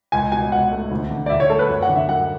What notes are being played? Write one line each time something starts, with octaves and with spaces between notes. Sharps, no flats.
C#2 G#5
B2 G#5
C#2 F#5
A3
D2
D3
D5
D2 E5
C#5
A3 A4
B4
F#2 C#5
F#5
D3
E5
F#2 F#5